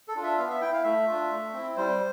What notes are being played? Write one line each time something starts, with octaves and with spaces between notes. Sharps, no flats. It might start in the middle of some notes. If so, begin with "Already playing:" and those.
A4
D4 F4
E5
B3 F5
E5
E4 G5
F5
A3 E5
D4 F4
A3
C4 E4
G3 C5